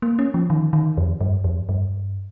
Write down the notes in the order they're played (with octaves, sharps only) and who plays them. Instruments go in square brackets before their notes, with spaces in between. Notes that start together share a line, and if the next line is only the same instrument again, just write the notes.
[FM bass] A#3
C#4
F3
D#3
D#3
F2
G2
F2
G2